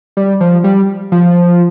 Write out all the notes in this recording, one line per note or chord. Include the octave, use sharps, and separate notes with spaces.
G3
F3
G3
F3